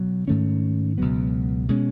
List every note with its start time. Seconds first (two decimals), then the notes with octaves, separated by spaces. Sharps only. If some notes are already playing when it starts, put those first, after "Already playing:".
Already playing: B2 F#3
0.28 G#2 D#3 A3 C#4
0.98 C#2 B2 F#3 B3
1.69 B2 G#3 C#4